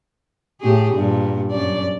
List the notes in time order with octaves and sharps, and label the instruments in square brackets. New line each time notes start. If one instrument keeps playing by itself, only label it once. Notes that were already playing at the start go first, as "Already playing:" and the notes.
[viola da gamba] A2 G4 G#4
G2 A#2
F#2 D5